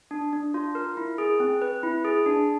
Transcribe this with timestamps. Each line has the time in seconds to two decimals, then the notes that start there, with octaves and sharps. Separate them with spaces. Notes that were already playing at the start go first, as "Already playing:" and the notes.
0.11 D4
0.33 D4
0.54 F4
0.75 A#4
0.97 E4
1.18 G#4
1.40 C4
1.62 B4
1.83 E4
2.05 G#4
2.26 D4